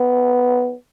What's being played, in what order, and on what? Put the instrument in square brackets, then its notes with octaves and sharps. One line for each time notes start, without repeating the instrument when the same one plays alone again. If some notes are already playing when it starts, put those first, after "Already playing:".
Already playing: [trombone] B3